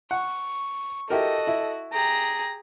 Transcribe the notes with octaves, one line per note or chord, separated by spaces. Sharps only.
F#5 C#6
E4 F#4 G4 A4 A#4 D#5
E4
G4 G#4 A#5